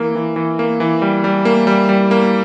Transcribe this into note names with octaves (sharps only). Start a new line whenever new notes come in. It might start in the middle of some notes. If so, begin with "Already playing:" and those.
Already playing: E3 A#3
E3
E3
A#3
E3
G3
G3
A#3
G3
G3
A#3